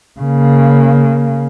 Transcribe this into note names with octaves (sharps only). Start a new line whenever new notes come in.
C#3 A#3